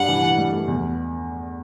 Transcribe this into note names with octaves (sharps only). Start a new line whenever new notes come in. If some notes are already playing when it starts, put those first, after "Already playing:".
Already playing: G2 D4 F#5
E3
E3
G2
A3
E2